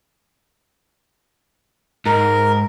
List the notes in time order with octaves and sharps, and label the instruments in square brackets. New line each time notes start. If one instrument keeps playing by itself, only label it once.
[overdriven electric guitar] G#2 [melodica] A#4